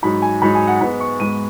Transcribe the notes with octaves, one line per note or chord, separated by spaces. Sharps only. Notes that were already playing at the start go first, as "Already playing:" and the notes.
G#2 F#3 D#4 B5
G#5
G#2 F#3 D#4 B5
G#5
F#5
G#2 G#3 B3 B5
C#6
G#2 G#3 B3 D#7